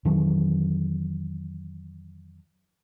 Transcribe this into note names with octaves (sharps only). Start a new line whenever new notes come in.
F2 D#3 E3 F#3